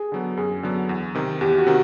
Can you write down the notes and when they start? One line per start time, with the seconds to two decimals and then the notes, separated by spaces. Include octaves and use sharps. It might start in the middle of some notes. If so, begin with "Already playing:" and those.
Already playing: G#4
0.12 D3 F#3 B3
0.37 F#2 G#4
0.63 D3 F#3 B3
0.89 E2
1.15 C3 D#3
1.41 E2 G4
1.58 F#4
1.67 C3 D#3